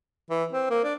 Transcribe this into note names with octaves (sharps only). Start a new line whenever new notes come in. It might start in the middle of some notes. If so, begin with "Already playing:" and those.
E3
C4
A#3
D4